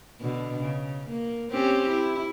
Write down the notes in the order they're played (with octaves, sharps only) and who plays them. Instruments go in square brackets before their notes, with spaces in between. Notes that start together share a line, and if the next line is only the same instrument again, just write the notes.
[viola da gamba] B2 D3
C#3
A#3
C4 C#4 G4
E4